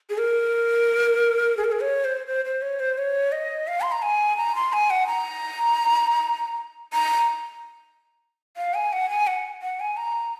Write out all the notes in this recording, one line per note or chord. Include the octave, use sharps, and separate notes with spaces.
G#4
A#4
G#4
A#4
G#4
C#5
C5
C5
C5
C#5
C5
C#5
D#5
F5
C6
A#5
G#5
A#5
C6
G#5
F#5
A#5
A#5
F5
G#5
F#5
G#5
F#5
F#5
G#5
A#5